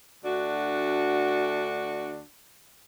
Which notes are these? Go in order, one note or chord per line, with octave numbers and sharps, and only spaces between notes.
D2 D4 F#4